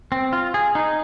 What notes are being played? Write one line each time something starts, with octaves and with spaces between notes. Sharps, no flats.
C4
F4
G#4
D#4